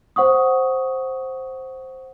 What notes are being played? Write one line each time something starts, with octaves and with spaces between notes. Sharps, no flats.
C5 F#5 C#6 D#6